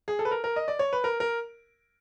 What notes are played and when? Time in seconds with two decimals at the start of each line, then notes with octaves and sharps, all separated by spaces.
0.08 G#4
0.19 A4
0.25 B4
0.31 A#4
0.44 A#4
0.56 D#5
0.68 D5
0.79 C#5
0.93 B4
1.04 A#4
1.20 A#4